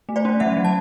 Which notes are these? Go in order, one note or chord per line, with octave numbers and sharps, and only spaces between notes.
A3
C5 D5
C#4
F#3 E5 F#5
F#3
A5